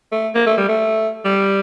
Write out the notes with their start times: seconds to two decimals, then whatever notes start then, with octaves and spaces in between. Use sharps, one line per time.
0.12 A3
0.35 A#3
0.46 A3
0.57 G3
0.68 A3
1.25 G3